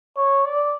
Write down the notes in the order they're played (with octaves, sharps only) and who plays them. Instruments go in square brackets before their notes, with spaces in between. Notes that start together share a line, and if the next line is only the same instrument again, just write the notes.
[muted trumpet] C#5
D5